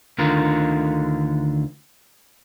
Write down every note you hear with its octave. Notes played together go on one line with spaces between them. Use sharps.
D2 D3 D#3 F4 A#4